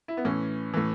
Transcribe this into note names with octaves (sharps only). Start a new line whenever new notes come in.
E4
B3
A2 E3 C#4
A2 E3